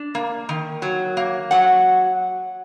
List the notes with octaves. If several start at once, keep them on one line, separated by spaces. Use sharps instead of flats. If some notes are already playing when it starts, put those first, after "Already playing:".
Already playing: D4
A#3
D#3
F#3
A#3
F#3 F#5